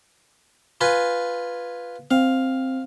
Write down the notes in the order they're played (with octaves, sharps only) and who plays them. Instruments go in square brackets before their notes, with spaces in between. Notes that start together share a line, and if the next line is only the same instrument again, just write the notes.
[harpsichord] F4 B4 G#5
[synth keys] C4 [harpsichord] F5